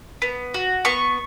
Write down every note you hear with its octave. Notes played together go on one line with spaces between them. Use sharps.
B3
F#4
B3 C#6